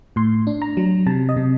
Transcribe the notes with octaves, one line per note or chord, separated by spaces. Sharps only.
A2 C6
D4
A#5
F#3
C3 A5
D#5
C3